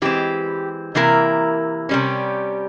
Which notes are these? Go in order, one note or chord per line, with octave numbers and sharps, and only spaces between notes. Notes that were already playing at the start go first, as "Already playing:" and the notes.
E3 G#3 C4 G4
C3 E3 A#3 E4 A#4
C3 G3 C#4